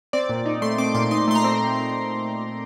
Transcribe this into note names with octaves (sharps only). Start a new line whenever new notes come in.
C4 D5
A#2
D#4
A3 C6
C4 D6
A#2 C6
D#4 C6
A3 C6
A#5
C4